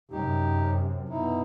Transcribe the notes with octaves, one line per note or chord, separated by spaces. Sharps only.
F#2 C3 D#4 G4
B2 D#4 E4